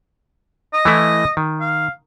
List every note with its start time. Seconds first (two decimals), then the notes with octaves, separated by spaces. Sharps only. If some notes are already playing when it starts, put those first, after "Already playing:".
0.73 D#5
0.85 E3 A3 E4
1.37 D#3
1.61 F5